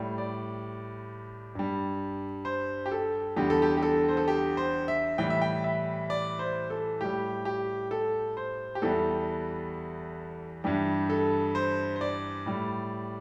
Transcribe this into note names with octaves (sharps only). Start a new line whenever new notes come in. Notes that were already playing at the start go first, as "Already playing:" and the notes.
Already playing: A2 G3
D5
G2 G3
C5
G4
A4
E2 D3 G3 G4
A4
G4
G4
A4
C5
A4
G4
C5
E5
A2 E3 G3 G5
E5
G5
E5
D5
C5
A4
A2 G3 G4
G4
A4
C5
G4
E2 E3 G3 A4
G2 E3 G3 G4
A4
C5
C5
D5
A2 G3